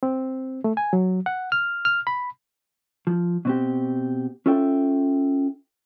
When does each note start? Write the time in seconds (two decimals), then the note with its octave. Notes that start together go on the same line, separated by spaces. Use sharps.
0.03 C4
0.64 A3
0.77 G#5
0.93 F#3
1.26 F#5
1.52 F6
1.85 F6
2.07 B5
3.07 F3
3.45 B2 C4 G4
4.46 C#4 F4 A4 E5 G5